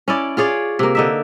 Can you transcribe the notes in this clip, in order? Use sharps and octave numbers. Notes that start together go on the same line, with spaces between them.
C#4 E4 D5
F4 G#4 C#5 D5
C3 A#3
D3 D#4 E5